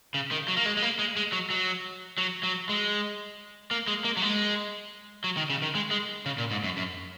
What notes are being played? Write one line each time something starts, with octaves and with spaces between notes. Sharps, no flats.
C#3
D#3
F#3
A#3
G#3
G#3
A#3
G#3
G#3
F#3
F#3
F#3
F#3
G#3
A#3
G#3
A#3
F#3
G#3
F#3
D#3
C#3
D#3
G#3
G#3
C#3
A#2
G#2
F#2
F#2